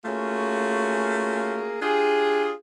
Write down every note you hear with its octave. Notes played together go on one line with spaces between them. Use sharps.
A3 A#3 C#4 F4 F#4 G#4
D4 F4 G4 G#4